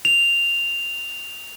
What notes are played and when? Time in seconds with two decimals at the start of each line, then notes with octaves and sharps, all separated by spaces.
0.05 F7